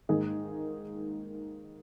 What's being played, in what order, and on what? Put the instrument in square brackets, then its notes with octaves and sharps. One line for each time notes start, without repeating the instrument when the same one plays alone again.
[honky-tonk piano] G#2 D#3 A#3 D#4 G#4